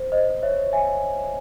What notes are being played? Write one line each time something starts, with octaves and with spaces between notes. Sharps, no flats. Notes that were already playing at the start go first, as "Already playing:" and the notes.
Already playing: C5
C5 D#5
C#5 E5
E5 G#5